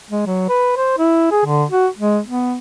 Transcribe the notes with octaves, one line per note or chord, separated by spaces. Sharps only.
G#3
F#3
B4
C5
E4
G#4
D3
F#4
G#3
B3